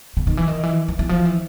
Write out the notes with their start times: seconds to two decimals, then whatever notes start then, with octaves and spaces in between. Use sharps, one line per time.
0.17 C#3
0.27 D#3
0.37 E3
0.48 D#3
0.63 E3
0.88 E3
0.99 E3
1.09 F3
1.25 E3